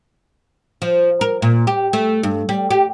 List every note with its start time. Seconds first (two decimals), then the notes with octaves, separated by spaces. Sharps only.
0.82 F3
1.21 A#4
1.42 A#2
1.67 G4
1.93 A3
2.23 G2
2.49 G3
2.70 G4